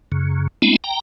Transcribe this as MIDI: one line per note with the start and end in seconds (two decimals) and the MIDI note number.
0.12 0.48 42
0.12 0.48 49
0.62 0.76 56
0.62 0.76 57
0.62 0.76 59
0.62 0.76 60
0.62 0.76 62
0.62 0.76 64
0.84 1.00 79
0.84 1.00 82